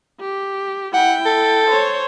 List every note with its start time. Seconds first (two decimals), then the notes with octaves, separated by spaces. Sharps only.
0.20 G4
0.94 E4 F#5 G5
1.26 A4
1.69 C5 C#5